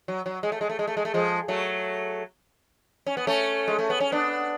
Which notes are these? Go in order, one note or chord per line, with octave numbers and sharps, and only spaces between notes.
F#3
F#3
G#3
A3
G#3
A3
G#3
A3
G#3
A3
F3 G#3
F#3 A3
C#4
B3
A3 C#4
G#3
A3
B3
C#4
B3 D4